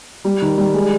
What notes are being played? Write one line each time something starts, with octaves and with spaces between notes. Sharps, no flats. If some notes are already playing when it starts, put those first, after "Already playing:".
G3
D#3
G3
G#3